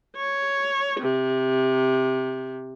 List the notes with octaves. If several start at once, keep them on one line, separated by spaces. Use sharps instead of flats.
C#5
C3